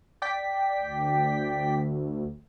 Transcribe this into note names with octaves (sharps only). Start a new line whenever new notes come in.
D5 G5 B6
D2